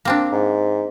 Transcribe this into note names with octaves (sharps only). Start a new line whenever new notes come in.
A#3 C4 D4
G#2